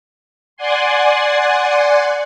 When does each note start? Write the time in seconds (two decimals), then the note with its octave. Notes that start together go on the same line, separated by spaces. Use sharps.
0.57 D5 F#5 G#5 C6